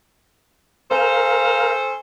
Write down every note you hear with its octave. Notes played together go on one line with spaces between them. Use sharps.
C#4 A4 A#4 C5 F5